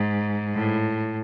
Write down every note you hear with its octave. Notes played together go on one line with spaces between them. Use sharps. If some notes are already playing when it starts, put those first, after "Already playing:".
Already playing: G#2
A2